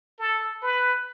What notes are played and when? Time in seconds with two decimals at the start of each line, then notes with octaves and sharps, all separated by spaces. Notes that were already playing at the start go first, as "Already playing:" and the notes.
0.19 A4
0.62 B4